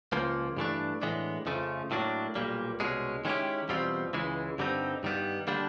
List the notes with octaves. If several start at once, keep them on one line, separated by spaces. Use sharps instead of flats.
C#2 C#3 F3 A#3
G2 E3 A3 D4
A2 E3 G#3 B3 D4
F2 C#3 F3 A3
A2 F#3 A#3 D4
B1 A#2 G3 A#3
C2 B2 G#3 C#4
D#3 G#3 C#4 E4 G4
E2 B2 G3 C4 F4
C#2 C#3 E3 G#3
G2 D3 G3 C4 D#4
G2 D#3 G3 B3
D3 G3 A#3 D4